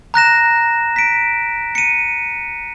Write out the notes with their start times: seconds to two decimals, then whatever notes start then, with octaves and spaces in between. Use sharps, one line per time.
0.14 A#5 F#6 A#6 E7
0.96 B6 D7
1.75 C#7 D#7